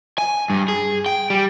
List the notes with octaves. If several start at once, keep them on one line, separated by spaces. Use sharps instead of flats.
G#5
G2
G#4
G5
G3